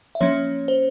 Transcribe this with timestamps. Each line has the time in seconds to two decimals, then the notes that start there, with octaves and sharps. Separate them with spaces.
0.15 E5
0.20 F3 A#3 C#4 C#5
0.68 C5